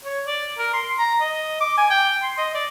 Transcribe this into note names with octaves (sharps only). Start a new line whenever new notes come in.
C#5
D5
A#4
C6
A#5
D#5
D6
G#5
G5
C6
D#5
D5